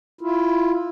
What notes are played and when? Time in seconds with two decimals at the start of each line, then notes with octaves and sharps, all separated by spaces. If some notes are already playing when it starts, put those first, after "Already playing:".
0.21 E4 F4